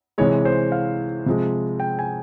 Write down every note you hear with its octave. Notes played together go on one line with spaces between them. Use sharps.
C3 E3 G#3 C#5
C5
F5
C3 F3 G#3
G5
G#5